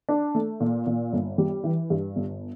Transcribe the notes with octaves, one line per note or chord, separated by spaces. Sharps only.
D4
A3
A#2
A#2
G1
G3
E3
G2
G1